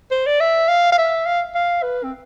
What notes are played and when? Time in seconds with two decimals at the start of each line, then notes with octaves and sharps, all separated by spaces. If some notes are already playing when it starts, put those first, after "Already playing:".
0.11 C5
0.26 D5
0.40 E5
0.68 F5
0.92 F5
0.98 E5
1.26 F5
1.55 F5
1.83 B4
2.04 C4